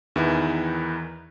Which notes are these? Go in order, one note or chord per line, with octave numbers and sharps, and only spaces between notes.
E2 D#3 E3 D#4 E4